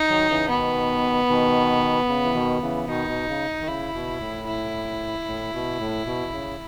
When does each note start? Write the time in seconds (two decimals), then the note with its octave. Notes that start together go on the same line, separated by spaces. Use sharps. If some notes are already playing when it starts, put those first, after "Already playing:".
Already playing: D#4
0.09 D#3 F#3
0.29 C#3 E3
0.49 B2 D#3 B3
1.29 B2 D#3
2.08 C#3
2.24 E3
2.35 B2 D#3
2.62 C#3 E3
2.88 B2 D#3 D#4
3.08 B2
3.28 C#3
3.61 D#3
3.67 C#3 E4
3.94 B2
4.20 A2
4.47 E4
5.27 A2
5.54 B2
5.79 A2
6.06 B2
6.32 C#3